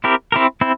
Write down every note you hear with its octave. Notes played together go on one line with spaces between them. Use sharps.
C4 E4 G4 A#4
C4 E4 G4 A#4
C4 E4